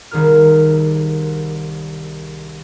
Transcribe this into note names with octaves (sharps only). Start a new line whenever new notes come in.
C2 D#3 G#4 A#4 F6